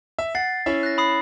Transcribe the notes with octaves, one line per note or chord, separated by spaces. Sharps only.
E5
F#5 A6 C7
C#4 E4 E5
F#6 A#6
B5 D#6 C7